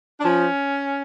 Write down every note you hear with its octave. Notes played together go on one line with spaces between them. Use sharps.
D4
F3 C#4